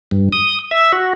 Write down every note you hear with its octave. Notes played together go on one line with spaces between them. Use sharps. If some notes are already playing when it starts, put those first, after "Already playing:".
G2
D#6
E5
F#4